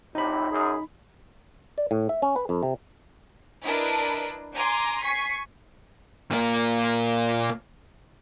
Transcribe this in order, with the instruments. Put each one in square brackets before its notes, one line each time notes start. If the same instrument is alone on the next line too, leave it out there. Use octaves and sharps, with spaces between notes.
[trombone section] A#1 A2 C3 [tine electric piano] D#4 B5
[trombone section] F#2 G#4
[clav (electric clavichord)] D5
A2
E5
C#4
B4
F2
C3
[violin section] D4 E4 A#4 B4 D#5 A5
G#5 A#5 C6 D6
G#5 C#6 B6 C7
[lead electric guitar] A#2 A#3